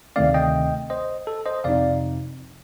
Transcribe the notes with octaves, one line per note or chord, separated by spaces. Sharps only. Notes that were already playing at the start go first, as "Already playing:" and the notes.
D2 C3 D#3 A3 C4 D5 F5
D#5 G5
C5 D#5
A4
C5 D#5
F2 C3 F3 C4 D#4 D5 F5